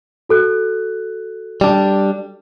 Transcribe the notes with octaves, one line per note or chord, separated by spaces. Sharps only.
F#4 A4 F#6
G3 D4